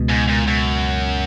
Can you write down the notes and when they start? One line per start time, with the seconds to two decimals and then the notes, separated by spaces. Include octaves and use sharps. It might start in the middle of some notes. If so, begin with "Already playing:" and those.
Already playing: C#2 B2 G#3
0.09 G#2
0.28 A#2
0.47 F#2